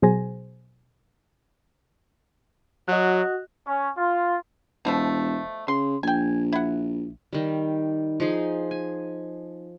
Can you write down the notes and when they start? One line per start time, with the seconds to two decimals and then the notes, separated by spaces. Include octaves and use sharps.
0.02 B2 F#3 G#4 C5 G#5 A#6
2.88 F#3 F#4 D#5 F#6
3.67 C#4
3.98 F4
4.85 E1 B2 F3 A3
5.68 C#3 C6
6.03 A#1 G5 G#5
6.53 E4 F#5
7.33 D#3 G3
8.20 F3 D#4 G#4
8.71 G#5